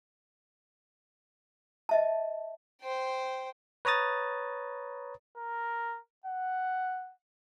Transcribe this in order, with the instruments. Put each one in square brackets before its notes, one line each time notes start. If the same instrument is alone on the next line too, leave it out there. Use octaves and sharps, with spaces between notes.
[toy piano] D#5 E5 A5
[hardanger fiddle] C5 G5
[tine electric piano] B4 C#5 A#5 D#6 A6
[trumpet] A#4
F#5